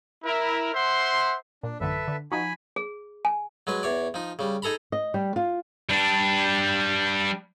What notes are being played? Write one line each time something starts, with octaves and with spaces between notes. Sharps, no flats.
E4 A#4
C5 E5 F#5 C6
A#2 D4
A1 F#2 D3 A4 B4 E5
D3
F3 D#4 F#4 G#5 B5
G#4
G#5
F#3 G#3 B4
E2 C#5 D5
F3 D#4
C#3 G3
D#4 G#4 A4 A#5 B5
D#5
G3
F4
G3 D4